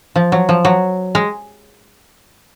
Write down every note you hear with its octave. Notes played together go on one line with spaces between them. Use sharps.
F3
F#3
F3
F#3
G#3